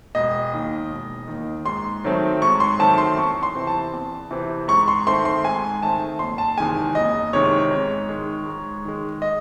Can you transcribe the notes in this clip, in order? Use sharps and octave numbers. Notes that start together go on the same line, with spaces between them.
E1 D#5
D#2 D#3
E1
D#2 D#3
G#2 C6
D#3 F#3 A3 C4
G#2 C#6
C6
D#3 F#3 A3 C4 A5
C6
E2 C#6
C6
C3 E3 C4
A5
E2
C3 E3 C4
G#2 C#6
C6
D#3 A3 C4 C6
C6
G#2 G#5
D#3 A3 C4 A5
F#1 C6
A5
E2 C3 D#3 G#3 G#5
F#1 D#5
E2 C3 D#3 G#3 C#5
G#2
D#3 G#3
G#2
D#3 G#3
D#5